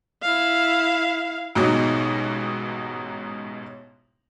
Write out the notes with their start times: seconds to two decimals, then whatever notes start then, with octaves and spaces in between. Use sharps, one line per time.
0.23 E4 F5
1.55 A1 G#2 B2 F#3 D#4